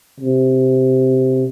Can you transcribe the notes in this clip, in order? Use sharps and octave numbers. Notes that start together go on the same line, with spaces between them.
C3